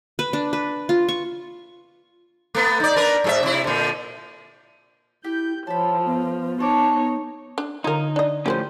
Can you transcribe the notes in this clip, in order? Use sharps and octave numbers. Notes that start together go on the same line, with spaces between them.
B4
D4
B4
F4
C#6
A3 B3
D#4 D5
D4 A#4 B4
G#2 G#4 E5
C3 E4
A#2 D3
E4 G4 G6
F3 A4 C#5 B5
B3
D#4 C#5 A5 D6
D4
D3 D#4 F4 A#4 G#6
D4 D5 D#5
A2 F3 C#4 G4 B4 C5